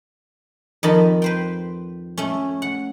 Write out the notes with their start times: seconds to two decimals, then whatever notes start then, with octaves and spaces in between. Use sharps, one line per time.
0.83 F2 D#3 D#5 A5 B5
1.22 B4 C5 G5
2.18 A3 C#4
2.62 F#5